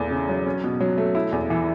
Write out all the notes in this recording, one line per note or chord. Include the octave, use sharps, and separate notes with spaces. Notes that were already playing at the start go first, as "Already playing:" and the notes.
Already playing: E2 A3
C#3
F#3
C#4
B2
F#3
A3
E4
E2
E3